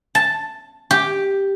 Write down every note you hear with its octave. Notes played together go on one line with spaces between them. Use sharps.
A5
G4